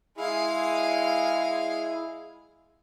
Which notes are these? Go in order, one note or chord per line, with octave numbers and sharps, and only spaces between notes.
G#3 E4 G#4 F5